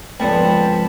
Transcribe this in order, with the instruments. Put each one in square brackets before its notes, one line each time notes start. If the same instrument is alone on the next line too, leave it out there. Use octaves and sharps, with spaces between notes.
[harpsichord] C#2 D3 [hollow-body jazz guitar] F3 B3 C4 [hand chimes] G5 [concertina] A5 B5